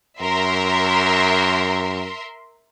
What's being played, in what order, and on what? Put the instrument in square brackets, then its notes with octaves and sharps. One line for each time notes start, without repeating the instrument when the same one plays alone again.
[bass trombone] F#2 [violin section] A#4 E5 C6